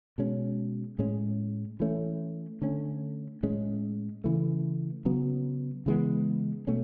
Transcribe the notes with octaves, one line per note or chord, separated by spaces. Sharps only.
B2 G#3 C#4
A2 G#3 C#4
E3 A3 C#4
D3 A3 C#4
A2 G#3 C#4
C#3 E3 A3
C#3 F#3 B3
C#3 E3 G#3 B3
B2 A3 C#4